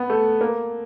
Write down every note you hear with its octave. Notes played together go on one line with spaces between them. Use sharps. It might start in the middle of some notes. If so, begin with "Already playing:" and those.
Already playing: B3
A3
A#3